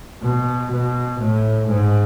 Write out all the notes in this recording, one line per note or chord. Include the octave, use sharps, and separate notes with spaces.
B2
B2
A2
G#2